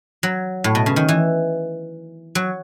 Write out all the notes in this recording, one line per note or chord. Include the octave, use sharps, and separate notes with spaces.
F#3
A2
B2
C#3
D#3
E3
F#3